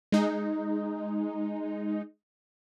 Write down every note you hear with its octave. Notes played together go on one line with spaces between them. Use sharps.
G#3 D#4